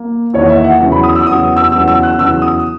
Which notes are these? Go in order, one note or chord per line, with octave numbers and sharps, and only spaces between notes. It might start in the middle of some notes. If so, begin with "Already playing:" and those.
Already playing: A#3
E2 D#3 A#3 C#5
E5
F#5
E2 C#3 F#3 B3
B5
D#6
E6
E2 C#3 F#3 B3 D#6
E6
E2 C#3 F#3 B3 E6
E6
F#6
E2 C#3 F#3 B3 E6
D#6